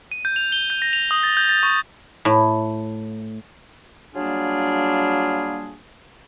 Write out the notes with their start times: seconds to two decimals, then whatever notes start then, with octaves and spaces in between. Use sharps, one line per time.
0.12 D#7
0.25 G6
0.36 F7
0.52 G7
0.70 G6
0.82 A#6
0.93 F7
1.11 D#6
1.23 A6
1.37 G6
1.49 A6
1.63 C#6
2.25 A2
4.15 F#3 G3 A#3 D4 F4 G#4